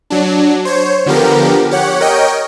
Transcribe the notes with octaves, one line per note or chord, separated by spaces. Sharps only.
F#3 D4
C5 C#5
D3 F3 B3 G4 A#4
G4 C#5 F#5
A#4 C#5 D#5 G5